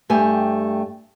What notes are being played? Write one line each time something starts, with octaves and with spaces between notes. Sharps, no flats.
G2 A3 G4 G5 G#5